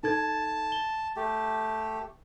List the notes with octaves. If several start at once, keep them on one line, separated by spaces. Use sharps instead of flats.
D#4 A4 A5 G#6
G7
A3 G4